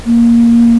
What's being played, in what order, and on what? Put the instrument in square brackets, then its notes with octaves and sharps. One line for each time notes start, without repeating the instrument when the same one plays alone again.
[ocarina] A#3